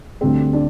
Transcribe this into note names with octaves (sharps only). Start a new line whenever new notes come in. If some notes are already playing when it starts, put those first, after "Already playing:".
D2 D3 G3 C4
D4